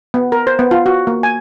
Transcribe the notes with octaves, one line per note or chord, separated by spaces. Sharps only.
B3
A#4
C5
B3
F4
F#4
A#3
G#5